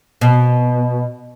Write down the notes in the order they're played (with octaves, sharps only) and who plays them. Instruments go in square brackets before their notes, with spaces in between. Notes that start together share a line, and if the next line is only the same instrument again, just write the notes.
[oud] B2